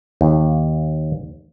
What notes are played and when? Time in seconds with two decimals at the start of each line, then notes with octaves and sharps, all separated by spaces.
0.21 D#2